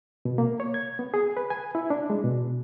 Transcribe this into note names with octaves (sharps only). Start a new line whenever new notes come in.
B2
A#3
C#5
G#6
B3
G#4
B4
G#5
E4
D4
G#3
B2